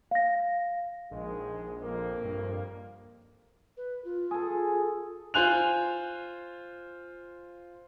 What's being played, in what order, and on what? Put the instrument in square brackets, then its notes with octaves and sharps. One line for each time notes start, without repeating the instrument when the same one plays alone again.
[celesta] F5 A#6
[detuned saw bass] A#1 [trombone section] D#3 G#3
[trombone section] F2 A#3
[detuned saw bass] G2
[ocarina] B4
F4
[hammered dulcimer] G#4 A4
[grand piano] F4 C5 G#5 F#6 F7